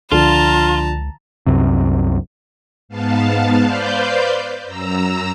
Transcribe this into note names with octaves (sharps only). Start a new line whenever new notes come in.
C#2 D3 F3 F4 A5 A#5
C2 F#2 C3
G#2 B3 F5 A5
B4 C5 D5 F5 G6
F#2 A#5 E6